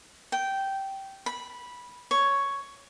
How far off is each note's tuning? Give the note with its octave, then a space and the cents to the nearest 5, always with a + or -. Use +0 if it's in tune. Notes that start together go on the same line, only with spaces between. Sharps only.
G5 -10
B5 -10
C#5 +5